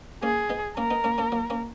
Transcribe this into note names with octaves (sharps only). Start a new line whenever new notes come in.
A#3 C#4 G#4
B3 D#4
A#3 C#4 A#4
B3 D#4
A#3 C#4
A#3 C#4
F#3 A#3
A#3 C#4